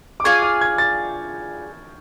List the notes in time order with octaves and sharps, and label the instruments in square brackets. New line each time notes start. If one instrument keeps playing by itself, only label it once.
[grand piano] D6
[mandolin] F4 G#4 D5 G#5 [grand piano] C#6
[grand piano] F6
G#6
A6